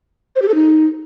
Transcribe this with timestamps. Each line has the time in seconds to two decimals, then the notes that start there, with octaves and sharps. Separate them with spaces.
0.36 C5
0.42 G4
0.48 A4
0.55 D#4